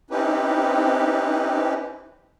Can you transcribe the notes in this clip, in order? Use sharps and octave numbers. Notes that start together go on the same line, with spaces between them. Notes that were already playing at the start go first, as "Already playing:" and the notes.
C4 C#4 D#4 E4 G4 B4